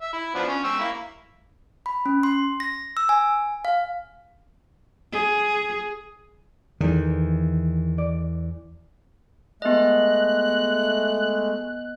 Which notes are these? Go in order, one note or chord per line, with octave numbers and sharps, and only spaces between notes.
E5
E4
F3 B3 D4
C#4
G5 C#6 E6
A#3 E4
B5
C#4
C6
A#6
E6
G#5
F5
G#4
E2 D#3
D5
G#3 A3 B3 D#5 F#6